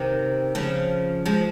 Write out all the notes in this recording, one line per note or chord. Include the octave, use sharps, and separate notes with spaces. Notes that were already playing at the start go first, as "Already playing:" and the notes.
Already playing: C3 D#3
C#3 F3
F3 G#3